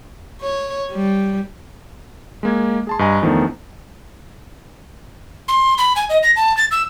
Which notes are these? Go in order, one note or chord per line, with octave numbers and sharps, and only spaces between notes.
C#5
G3
G#3 A#3 G#6
G#4 A5 C6
G2 D#5 G#5 A#5
E2 D#3 F3 A3 B3 D4
C6
B5
G#5
D#5
A#6
A5
A6
E6